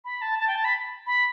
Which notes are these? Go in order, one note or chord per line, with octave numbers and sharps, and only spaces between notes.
B5
A5
A5
G5
A5
B5
B5